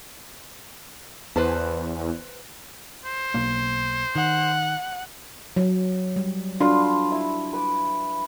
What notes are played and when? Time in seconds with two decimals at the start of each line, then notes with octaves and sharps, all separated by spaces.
1.36 E2 B4 C5 A5
3.05 C5
3.34 B1 A#3
4.16 D#3 F#5
5.56 F#3
6.16 G3
6.60 D4 F4 F#4 B4 C6
7.12 E4
7.53 B4 D6